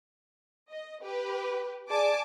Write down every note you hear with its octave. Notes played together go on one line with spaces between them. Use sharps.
D#5
G4 B4
G#4 D5 G#5 A5 D6